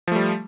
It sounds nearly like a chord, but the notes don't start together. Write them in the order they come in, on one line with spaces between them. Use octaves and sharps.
F3 A3 G3